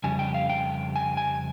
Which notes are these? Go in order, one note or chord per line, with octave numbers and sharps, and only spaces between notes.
F2 C#3 G3 G#5
G5
F5
G5
G#5
G#5